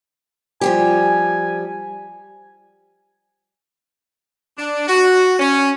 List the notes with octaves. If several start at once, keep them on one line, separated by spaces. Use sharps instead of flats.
F3 G3 G4 G#5
D4
F#4
C#4